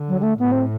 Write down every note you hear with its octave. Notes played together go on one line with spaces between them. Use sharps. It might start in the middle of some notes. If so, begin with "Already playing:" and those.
Already playing: D3
F#3
G3
A3
A2 B3
C4